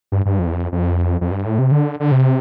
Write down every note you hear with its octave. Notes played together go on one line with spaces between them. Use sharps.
G2
G2
F2
E2
F2
F2
F2
G2
A2
C3
D3
D3
C3